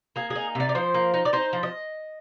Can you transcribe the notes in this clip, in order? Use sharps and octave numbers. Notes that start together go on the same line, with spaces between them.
A#3 G#4
G#4
D#4
C3 D5
D5
F3 C5
A#3
D#4
D5
D#4 C5
F3
D#5